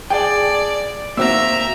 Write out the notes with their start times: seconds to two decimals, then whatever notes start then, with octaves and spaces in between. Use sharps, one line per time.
0.10 G#4 D5 G5 A5
1.17 A#3 C4 F#4 E5 A#5 E6